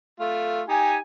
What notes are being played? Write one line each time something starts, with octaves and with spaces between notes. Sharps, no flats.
A3 F4
D#4 G4 G#5